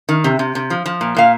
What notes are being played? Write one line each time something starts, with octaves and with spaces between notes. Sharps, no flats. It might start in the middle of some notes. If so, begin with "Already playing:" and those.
D#3
C3
C3
C3
F3
F3
A#2
A#2 F5